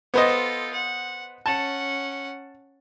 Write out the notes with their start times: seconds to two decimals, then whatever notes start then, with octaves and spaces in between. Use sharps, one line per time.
0.14 B3 F4 A4 C5 D#5
0.73 F#5
1.46 C#4 F#5 A5